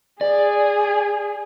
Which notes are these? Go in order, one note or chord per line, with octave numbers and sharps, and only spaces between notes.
G#4 D5